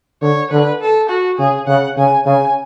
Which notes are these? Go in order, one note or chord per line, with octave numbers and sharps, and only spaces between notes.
D3 C#5
D3 B4
A4
F#4
C#3 G#4
C#3 F#5
C#3 G#5
C#3 G#5